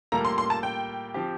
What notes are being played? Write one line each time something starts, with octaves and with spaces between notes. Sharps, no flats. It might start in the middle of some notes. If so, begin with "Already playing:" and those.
A2 G3 A#3 F4 A4 A#5
C6
C6
A5
G5
F3 C4 G4